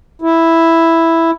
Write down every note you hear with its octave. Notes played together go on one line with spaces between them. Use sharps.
E4